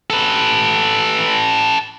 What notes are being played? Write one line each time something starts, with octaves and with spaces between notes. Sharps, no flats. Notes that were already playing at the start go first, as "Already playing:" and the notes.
A4 B4